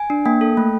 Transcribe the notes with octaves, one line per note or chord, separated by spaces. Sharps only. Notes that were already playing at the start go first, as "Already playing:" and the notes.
Already playing: G#5
D4
A#3 G5
A4
A3